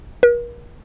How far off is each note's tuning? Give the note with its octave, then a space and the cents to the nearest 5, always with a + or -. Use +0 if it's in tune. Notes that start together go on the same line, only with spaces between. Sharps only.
A#4 +45